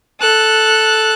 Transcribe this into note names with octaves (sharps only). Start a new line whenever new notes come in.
A4 F#6